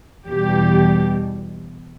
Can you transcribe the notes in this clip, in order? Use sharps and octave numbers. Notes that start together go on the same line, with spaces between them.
E2 B2 G3 G4